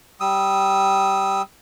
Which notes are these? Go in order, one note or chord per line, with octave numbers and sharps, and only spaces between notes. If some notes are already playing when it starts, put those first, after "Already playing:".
G3 D#6 E6